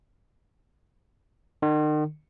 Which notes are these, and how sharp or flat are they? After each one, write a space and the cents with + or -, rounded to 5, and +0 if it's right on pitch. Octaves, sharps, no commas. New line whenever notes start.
D#3 -40